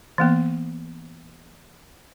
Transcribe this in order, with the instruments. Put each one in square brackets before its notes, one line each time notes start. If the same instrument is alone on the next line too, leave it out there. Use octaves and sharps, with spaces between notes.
[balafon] E3 A#3 B3